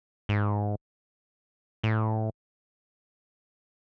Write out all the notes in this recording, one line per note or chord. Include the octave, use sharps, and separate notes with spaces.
G#2
A2